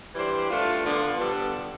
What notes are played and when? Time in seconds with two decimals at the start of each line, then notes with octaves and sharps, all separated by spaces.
0.15 E3 G3 D4 G4 C5
0.50 A3 D4 F4
0.84 D3 F3 B3 F4
1.19 D3 G3 B3 D4 A4